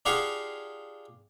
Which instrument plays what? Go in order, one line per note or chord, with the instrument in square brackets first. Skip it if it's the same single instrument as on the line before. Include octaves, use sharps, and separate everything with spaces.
[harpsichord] D4 F4 G4 G#4 F5 F#5